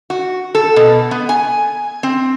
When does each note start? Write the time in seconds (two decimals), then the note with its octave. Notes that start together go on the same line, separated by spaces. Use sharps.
0.10 F#4
0.55 A4
0.76 B2
1.11 B3
1.29 G#5
2.03 C4